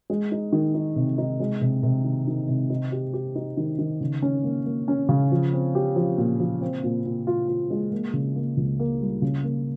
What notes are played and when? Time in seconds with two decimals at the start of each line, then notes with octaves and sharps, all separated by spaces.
0.10 G#3
0.32 D#4
0.52 D#3
0.74 D#4
0.96 C3
1.18 D#4
1.40 G#3
1.61 C3
1.83 C3
2.04 D#3
2.27 D#3
2.48 C3
2.70 D#4
2.92 G4
3.14 G4
3.35 D#4
3.57 D#3
3.79 D#3
4.01 C#3
4.22 C#4
4.44 A#3
4.66 A#3
4.88 C#4
5.09 C#3
5.32 F3
5.53 C4
5.75 G4
5.96 F3
6.18 A#2
6.40 F3
6.61 C4
6.84 A#2
7.06 A#2
7.27 F4
7.48 F4
7.70 G#3
7.92 A#3
8.13 C#3
8.36 A#3
8.57 C#2
8.80 A#3
9.01 G3
9.22 C#3
9.44 A#3